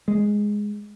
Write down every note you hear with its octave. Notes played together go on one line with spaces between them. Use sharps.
G#3